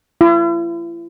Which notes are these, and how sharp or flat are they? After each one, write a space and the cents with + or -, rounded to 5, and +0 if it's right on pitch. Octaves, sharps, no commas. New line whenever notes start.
E4 +45